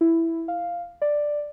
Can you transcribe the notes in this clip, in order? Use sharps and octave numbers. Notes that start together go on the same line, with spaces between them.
E4
F5
D5